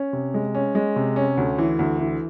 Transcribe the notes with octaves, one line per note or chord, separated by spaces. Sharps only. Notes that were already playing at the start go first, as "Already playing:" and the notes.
Already playing: C#4
C3
G#3
C#4
G#3
C3
C#4
D2
E3
D2
E3